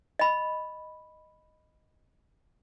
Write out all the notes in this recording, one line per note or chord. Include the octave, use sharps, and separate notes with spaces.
D#5 B5